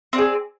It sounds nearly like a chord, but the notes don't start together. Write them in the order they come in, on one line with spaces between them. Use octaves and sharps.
C4 D5 G#4